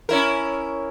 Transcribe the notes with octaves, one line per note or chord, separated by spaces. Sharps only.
C#4 E4 A#4